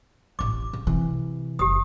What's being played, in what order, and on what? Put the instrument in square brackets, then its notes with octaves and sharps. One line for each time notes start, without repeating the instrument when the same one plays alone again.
[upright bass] D1 A1 [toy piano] D6
[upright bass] C#3
C3 E3
[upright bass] F#1 [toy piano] G4 D#6